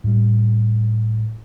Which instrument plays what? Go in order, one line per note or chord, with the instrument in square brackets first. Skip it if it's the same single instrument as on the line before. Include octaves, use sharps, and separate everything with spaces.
[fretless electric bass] A2 G3